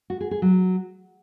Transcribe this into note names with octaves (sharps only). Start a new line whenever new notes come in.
F#4
G#4
G#4
F#3